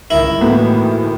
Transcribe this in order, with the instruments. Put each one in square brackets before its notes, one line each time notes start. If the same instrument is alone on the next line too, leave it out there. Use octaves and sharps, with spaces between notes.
[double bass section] C#2 G2 D#3 [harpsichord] E4 [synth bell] A#4 E5
[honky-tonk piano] A2 [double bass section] D#3 E3 [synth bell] A#3 F#4 B4